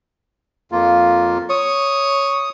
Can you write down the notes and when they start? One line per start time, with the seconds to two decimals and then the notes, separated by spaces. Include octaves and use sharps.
0.72 F2 A#3 F4
1.50 C#5 D#6